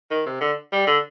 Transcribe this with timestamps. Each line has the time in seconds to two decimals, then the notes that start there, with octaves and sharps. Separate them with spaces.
0.11 D#3
0.26 C3
0.41 D3
0.73 G3
0.87 D3